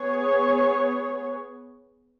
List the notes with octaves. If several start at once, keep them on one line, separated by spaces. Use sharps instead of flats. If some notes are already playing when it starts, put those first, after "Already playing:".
Already playing: B3 G#4 C#5